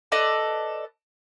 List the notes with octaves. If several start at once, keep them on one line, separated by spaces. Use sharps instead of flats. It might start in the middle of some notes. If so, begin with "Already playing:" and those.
A4 B4 D5 D#5